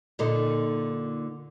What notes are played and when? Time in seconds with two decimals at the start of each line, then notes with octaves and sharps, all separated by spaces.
0.19 A#2 D3 D#4